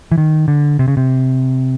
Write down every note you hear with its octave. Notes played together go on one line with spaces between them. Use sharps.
E3
D#3
D3
C3
C#3
C3